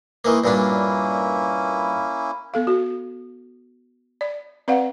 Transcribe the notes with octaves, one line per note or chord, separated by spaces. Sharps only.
D#3 E3 A#3
G2 A#2 A#3 C#4 D4 E4
B3 A4 F5
F#4
D5
C4 B4 D5 F5 F#5